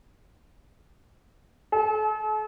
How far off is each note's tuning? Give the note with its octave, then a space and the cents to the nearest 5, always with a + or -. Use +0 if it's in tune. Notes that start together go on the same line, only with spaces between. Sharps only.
A4 -45